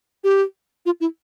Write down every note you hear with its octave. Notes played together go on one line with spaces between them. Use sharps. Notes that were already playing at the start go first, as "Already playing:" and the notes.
G4
F4
E4